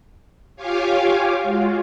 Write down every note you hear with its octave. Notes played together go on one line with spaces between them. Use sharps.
F4 G4 C#5 F5 G#5 D6
G#3 F4 F#4